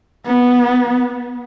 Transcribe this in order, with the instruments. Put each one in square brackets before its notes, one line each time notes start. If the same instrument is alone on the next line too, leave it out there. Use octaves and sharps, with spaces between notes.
[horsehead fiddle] B3